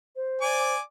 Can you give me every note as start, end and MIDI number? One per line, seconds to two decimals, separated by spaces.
0.16 0.74 72
0.42 0.80 74
0.42 0.80 80
0.42 0.80 86